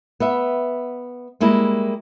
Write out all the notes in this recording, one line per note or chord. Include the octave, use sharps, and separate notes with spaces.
B3 E5
G3 G#3 A#3 E4